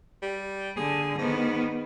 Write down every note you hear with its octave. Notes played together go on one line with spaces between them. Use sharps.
G3
D3 G#4
G#2 D#3 B3